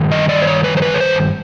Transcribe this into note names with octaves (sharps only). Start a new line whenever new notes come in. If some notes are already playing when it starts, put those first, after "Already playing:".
Already playing: G2 D#3
D#5
D5
C5
C#5
B4
C5
B4
C#5
C5